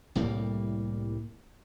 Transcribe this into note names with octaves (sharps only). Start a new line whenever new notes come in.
C2 A2 G3 A#3